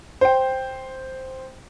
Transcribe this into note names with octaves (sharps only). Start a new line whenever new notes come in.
C5 G5